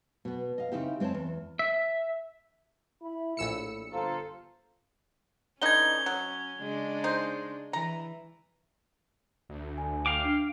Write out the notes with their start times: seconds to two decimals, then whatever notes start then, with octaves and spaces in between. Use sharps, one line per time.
0.25 B2 B3
0.58 D#5 F5
0.72 C#3 C4 D#4 E4 G4
1.00 G#3 C4 C5 C#5 A5
1.14 E2
1.59 E5
3.02 E4 B5
3.37 A#1 A2 E6 C#7
3.92 G1 F4 A4 C5 A#5
5.61 D3 E3 C#4 D#4 G#6 G7
6.06 F#3
6.60 C#3 G#3 D4
7.04 D#4 C5
7.73 E3 A#5
9.49 D2
9.78 G#5
10.06 F5 G5 D6
10.25 D4